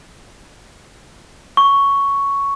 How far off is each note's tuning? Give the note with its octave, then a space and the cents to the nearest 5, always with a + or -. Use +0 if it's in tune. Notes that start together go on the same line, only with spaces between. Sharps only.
C#6 +5